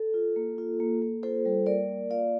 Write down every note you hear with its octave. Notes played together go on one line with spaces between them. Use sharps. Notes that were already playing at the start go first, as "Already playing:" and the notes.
Already playing: A4
F4
A#3
F4
A#3
A#3
F4 A4 C5
G3
A#3 A#4 D5
A#3
F4 D5 F5